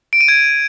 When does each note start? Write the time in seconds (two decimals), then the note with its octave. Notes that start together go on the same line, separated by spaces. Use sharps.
0.13 D7
0.21 D#7
0.28 G#6